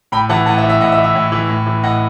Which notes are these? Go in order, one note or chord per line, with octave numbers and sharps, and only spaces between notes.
A2 G5 B5
E3 F#5 A5
A2 F#5 A5
E5
E3
E5
A2 D#5 F#5
E5
E3
E5
A2
E3
A2
E3
A2 D#5 F#5